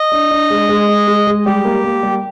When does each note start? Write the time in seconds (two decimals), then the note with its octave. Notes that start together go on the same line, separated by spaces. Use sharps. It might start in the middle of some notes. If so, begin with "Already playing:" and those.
Already playing: D#5
0.12 D4
0.31 D4
0.50 G#3
0.69 G#3
0.88 G#3
1.07 G#3
1.27 G#3
1.46 G3 G4
1.65 A#3
1.84 A#3
2.03 G3